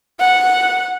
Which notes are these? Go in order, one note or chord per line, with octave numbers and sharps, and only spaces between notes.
F#5